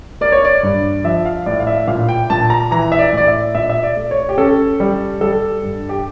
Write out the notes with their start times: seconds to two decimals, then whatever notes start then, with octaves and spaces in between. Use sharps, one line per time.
0.21 A#3 D5
0.32 C#5
0.45 D5
0.63 G2
1.04 F3 E5
1.25 F5
1.46 A2 D5
1.60 F5
1.67 E5
1.87 A#2 F5
2.09 G5
2.30 A#2 A5
2.50 A#5
2.71 E3 A#5
2.92 E5
2.99 D5
3.13 A2 D5
3.27 E5
3.55 A#2 E5
3.61 D5
3.70 E5
3.83 D5
3.96 A3
4.11 C#5
4.29 G4
4.38 C#4 A4
4.80 G3
5.21 G3 A4
5.63 G2
5.89 G4